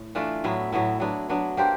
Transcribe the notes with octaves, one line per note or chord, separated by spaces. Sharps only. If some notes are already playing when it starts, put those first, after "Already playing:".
Already playing: A2
E3 A3 D4 F4
A2 F#3 B3 E4
A2 F#3 B3 E4
F#3 B3 D4
F#3 B3 D4
A#3 D4 G4 C5